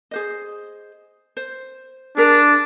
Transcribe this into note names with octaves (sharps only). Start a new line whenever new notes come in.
G#4 C5 D#5
C5
D4 G#4 A#4